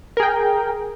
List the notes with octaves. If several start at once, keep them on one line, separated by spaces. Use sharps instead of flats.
G#4 A#4 G5